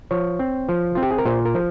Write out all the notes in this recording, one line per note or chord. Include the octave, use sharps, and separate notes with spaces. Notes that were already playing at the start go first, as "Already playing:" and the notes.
F3 C#5
C4
F3
C4 F4
G4
G#4
A#4
A#2 C5
A#4
F3